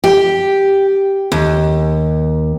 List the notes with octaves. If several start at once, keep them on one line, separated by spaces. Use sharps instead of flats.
G4
D#2